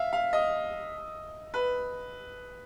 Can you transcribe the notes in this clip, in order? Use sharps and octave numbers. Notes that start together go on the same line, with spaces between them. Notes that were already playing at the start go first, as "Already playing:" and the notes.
Already playing: E5 F5
F5
D#5
B4